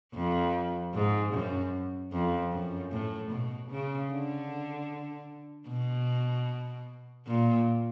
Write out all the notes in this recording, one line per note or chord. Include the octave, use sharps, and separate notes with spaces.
F2
G#2
F#2
F2
F#2
A2
B2
C#3
D3
B2
A#2